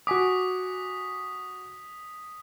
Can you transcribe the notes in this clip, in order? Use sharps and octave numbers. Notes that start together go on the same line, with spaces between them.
F#4 G#5 D6 D#6 B6